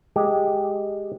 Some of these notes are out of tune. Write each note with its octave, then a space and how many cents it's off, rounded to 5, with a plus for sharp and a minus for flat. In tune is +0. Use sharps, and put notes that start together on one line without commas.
G#3 +0 G4 +0